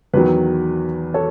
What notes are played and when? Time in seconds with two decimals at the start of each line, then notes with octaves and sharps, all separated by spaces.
0.13 E2 D#3 F#3 B4
1.14 A4 C#5